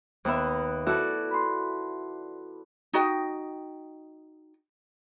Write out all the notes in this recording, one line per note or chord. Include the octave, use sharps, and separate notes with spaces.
D#2 B3 E5
E4 F#4 A4 D5
B5 C6
D#4 F#4 D#5 G5